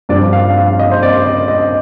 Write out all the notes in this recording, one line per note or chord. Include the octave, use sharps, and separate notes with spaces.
G2 F3 D5
F5
F5
D#5
C5
D5
D#5
D#5